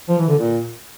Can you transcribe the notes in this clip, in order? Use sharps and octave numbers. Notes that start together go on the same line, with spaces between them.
F3
E3
D3
A#2